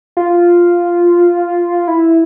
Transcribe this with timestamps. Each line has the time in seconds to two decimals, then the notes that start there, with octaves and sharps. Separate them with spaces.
0.17 F4
1.88 E4